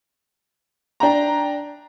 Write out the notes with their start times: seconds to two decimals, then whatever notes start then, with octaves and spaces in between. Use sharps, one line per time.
1.00 D4 G5 A#5